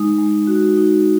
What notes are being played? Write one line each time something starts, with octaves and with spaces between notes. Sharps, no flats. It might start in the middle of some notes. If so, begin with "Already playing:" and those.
Already playing: G#3 D#4 D#6
G#3
F#4
D#4